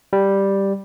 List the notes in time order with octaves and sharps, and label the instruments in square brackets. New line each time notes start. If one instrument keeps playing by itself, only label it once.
[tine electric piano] G3